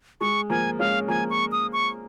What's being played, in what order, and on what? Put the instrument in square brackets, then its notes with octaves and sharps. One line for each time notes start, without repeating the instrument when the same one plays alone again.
[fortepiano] G#3 [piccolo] C#6
[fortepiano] F3 A#3 [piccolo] G#5
[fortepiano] G#3 C#4 [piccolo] F5
[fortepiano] F3 A#3 [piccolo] G#5
[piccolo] C#6
D#6
C#6